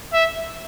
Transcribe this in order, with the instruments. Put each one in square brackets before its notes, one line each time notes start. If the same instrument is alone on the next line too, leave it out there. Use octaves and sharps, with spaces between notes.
[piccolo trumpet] E5